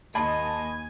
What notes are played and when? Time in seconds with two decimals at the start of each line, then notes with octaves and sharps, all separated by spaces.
0.15 D#2 D#5 G#5 A5 B5 C6